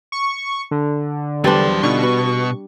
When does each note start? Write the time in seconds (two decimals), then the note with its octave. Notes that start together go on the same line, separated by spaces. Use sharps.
0.12 C#6
0.71 D3
1.44 E2 F#3 G3 D4 B4 C5 C6
1.83 B2 D3 D#4 F4 C#6
2.03 F#4 B4